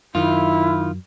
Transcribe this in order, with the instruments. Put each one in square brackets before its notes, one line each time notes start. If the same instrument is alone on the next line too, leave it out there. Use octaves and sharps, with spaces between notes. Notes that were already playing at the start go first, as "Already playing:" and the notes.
[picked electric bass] F#2 [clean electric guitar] D#3 F4 [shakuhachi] E4